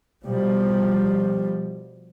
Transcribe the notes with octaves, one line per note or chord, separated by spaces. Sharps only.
B2 F3 G3